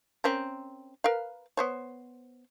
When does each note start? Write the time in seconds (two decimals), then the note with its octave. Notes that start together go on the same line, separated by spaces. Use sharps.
0.24 C4 C#4 A#4
1.04 A#4 B4 F5
1.57 B3 C5 C#5